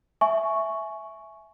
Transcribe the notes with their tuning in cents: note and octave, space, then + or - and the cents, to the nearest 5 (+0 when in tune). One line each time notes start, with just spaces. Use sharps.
E5 +0 G#5 +20 C#6 +0